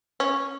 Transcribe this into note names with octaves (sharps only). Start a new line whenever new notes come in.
C#4